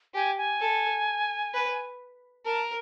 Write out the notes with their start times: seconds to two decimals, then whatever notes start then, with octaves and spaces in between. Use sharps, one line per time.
0.14 G4 G#5
0.37 G#5
0.60 A4
1.54 B4
2.45 A#4 A5